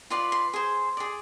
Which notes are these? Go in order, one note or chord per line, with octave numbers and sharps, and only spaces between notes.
F4 B4 D5 C6
C6
G#4 C5
G#4 D5